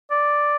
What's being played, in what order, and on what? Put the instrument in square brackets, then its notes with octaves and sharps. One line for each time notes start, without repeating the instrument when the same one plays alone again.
[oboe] D5